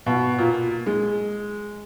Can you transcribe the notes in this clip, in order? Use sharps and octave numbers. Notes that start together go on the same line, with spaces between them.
B2
A#2
G#3